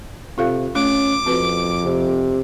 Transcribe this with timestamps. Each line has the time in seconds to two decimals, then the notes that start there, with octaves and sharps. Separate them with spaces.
0.38 C3 F4 A4 F5
0.75 A3 C#4 D6
1.26 F2 C4 F#4 B4
1.84 C3